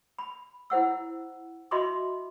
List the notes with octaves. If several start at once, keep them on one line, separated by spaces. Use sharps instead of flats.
B5
E4 C5 F#5 E6
F#4 D#5 E5 B5 C6 D6